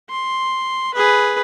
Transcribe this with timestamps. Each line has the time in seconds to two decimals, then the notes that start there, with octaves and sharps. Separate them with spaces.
0.10 C6
0.94 G#4 B4